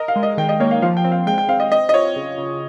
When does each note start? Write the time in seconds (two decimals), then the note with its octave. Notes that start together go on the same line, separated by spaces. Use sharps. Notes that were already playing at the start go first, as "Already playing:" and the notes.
Already playing: A#4 D#5
0.08 F5
0.16 G#3
0.23 D#5
0.37 D#3 G5
0.49 D#5
0.60 A#3 C#5
0.71 F5
0.82 F3 F5
0.97 G5
1.04 C4
1.12 F5
1.27 G#3 G5
1.38 G5
1.49 C4 F5
1.60 D#5
1.72 C4 D#5
1.89 D#5
1.93 F4 C#5
2.16 C#3
2.38 C#3